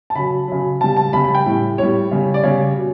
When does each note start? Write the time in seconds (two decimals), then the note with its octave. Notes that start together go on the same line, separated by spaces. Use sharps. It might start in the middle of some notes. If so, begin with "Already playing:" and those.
0.10 A5
0.15 C#3 F#3 B5
0.48 C#3 F#3
0.81 C#3 G3 A5
0.97 A5
1.13 C#3 G3 B5
1.24 B5
1.35 G5
1.46 A2 G3
1.78 A2 G3 C#5
2.11 C#3 G3
2.34 D5
2.43 C#3 G3 C#5
2.76 B2